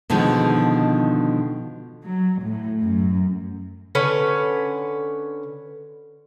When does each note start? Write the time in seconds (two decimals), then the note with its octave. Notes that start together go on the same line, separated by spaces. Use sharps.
0.10 B2 D3 D#3 F3 G#3
2.05 F#3
2.46 A2
2.84 F#2
3.95 D3 C#4 B4